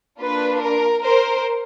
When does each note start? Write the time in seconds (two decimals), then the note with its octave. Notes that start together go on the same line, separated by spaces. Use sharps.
0.20 A#3 D4 F4 B4
0.61 A#4
1.03 A#4 C5